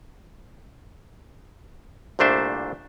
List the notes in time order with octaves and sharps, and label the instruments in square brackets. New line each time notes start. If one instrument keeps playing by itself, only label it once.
[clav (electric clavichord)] C2 A#2 A3 D4 C5 E5